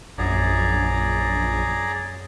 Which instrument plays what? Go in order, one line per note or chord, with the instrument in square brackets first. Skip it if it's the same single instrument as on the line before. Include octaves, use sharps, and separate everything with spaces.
[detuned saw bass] A#1 [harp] F#2 [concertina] G#4 D5 A#5